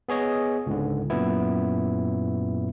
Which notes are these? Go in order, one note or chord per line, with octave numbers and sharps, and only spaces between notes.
B3 G#4 C#5 D#5
C#2 G#2 D3
F#2 A#2 B3 E4